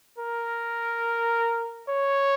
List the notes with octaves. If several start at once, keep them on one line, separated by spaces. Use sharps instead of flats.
A#4
C#5